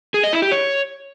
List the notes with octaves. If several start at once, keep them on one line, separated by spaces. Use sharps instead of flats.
G#4
D#5
E4
G4
C#5